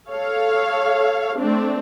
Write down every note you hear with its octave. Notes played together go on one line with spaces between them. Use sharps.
A4 C#5 F5
A3 C4 D4